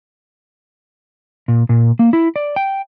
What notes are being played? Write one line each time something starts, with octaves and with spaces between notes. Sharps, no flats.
A#2
A#2
A#3
E4
D5
G5